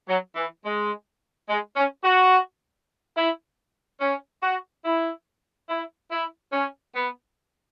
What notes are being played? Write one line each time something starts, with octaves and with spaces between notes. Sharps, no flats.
F#3
E3
G#3
G#3
C#4
F#4
E4
C#4
F#4
E4
E4
E4
C#4
B3